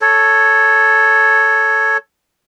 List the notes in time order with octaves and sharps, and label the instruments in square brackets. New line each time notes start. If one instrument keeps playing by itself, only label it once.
[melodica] A4 C#5